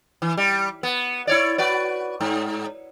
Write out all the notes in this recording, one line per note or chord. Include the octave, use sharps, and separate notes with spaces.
E3
G3
B3
E4 C#5 D5
F#4 B4 D5
G#2